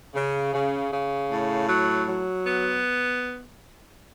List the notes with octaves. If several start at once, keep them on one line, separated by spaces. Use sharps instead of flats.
C#3
C#3
C#3
A2
F#3
F#3
B3